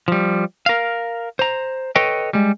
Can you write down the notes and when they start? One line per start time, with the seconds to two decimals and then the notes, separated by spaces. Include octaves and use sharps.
0.08 F3 G3
0.66 A#4 F5
1.39 C5 A#5
1.96 A4 B4 C#5 D#5 G5
2.33 G3 G#3